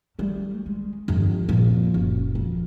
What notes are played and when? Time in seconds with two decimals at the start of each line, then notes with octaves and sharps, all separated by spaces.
0.19 G3 A3
0.66 G#3
1.08 G1 F2
1.48 F2 A#2
1.94 F#1
2.35 F2